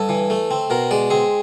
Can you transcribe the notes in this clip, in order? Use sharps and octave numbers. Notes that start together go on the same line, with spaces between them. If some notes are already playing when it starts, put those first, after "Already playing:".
Already playing: G2 A4
E3
A3
C4
B2 A#4
G#3 D5
C4 G#4